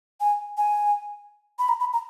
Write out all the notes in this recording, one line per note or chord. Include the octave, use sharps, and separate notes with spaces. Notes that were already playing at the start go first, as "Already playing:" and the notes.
G#5
G#5
B5
A#5
B5
A#5